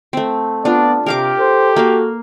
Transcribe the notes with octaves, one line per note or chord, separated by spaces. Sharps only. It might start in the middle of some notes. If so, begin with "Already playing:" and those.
A3 C4
B3 D4 F4 D5
C3 G4 A#4 F5 D6
A4 C5
A#3 F#4 F5